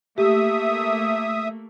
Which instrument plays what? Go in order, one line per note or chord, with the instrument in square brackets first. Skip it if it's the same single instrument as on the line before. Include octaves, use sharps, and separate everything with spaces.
[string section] A3 A#3 [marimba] G4 [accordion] E5 D#6